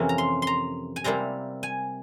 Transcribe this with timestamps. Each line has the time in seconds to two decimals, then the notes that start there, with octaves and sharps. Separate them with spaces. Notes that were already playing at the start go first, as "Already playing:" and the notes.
Already playing: F2 C3 E3 A#3 C#4
0.09 A#5
0.18 C6
0.42 A#5 C6
0.96 G#5
1.04 C3 G3 A#3 E4 A#5
1.63 G#5